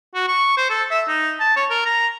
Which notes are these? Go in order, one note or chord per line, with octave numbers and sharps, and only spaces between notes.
F#4
C#6
C5
A4
E5
D#4
A5
C#5
A#4
A#5